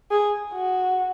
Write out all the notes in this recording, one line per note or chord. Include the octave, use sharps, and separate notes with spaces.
G#4
F#4